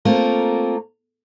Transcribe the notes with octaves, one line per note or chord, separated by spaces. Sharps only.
A3 A#3 C4 F4 A#4